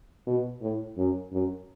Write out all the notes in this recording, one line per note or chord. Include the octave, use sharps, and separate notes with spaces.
B2
A2
F#2
F#2